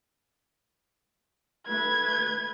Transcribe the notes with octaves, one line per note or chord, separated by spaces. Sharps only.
A3 B4 G#6